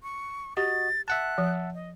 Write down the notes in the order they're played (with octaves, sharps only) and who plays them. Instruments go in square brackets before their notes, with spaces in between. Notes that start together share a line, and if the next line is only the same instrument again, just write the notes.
[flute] C#6
[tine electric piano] F#4 D#5 [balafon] G4 [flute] A6
[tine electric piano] E5 F#5 A5 [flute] F#6
[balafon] F3
[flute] D#5